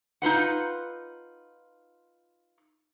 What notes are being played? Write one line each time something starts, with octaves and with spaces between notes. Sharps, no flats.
D#4 F4 B4 F#5